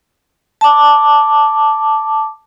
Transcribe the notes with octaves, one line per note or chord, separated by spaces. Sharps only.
A5 D6